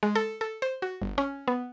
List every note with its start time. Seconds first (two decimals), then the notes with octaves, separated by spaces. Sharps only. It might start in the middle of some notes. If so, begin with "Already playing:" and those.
0.03 G#3
0.15 A4
0.41 A4
0.62 C5
0.82 F#4
1.02 G1
1.18 C#4
1.48 B3